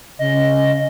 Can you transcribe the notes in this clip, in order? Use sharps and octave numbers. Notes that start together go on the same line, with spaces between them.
C#3 D#5